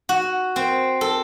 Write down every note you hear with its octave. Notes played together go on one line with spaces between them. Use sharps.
F#4
C4
A4